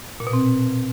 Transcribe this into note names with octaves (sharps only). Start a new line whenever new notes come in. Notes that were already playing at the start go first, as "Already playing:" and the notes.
A#2
B2
C4